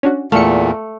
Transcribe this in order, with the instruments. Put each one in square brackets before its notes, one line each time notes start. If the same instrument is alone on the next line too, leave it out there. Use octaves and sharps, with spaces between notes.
[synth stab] C#4 D4 F#4
[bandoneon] E2 A#2 [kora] A3 [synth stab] F5 C#7